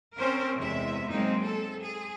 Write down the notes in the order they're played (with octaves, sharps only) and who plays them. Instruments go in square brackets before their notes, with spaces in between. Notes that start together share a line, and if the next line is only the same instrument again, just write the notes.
[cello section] C4 C#4 A#4 C5
E2 C3 G#3 E5
F#3 G#3 A#3 C4 D#4
A4
G#4